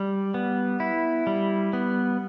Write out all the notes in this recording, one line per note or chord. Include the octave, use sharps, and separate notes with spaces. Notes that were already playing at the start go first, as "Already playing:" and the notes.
Already playing: G3
B3
E4
G3
B3